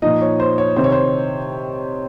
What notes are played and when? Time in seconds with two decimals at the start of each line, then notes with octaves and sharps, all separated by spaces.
0.02 A#2 F3 D#4 D#5
0.21 C#5
0.40 C5
0.58 C#5
0.76 C3 D#3 C5
0.84 C#5
0.92 C5